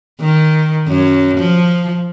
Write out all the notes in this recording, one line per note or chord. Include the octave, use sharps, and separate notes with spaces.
D#3
F#2
F3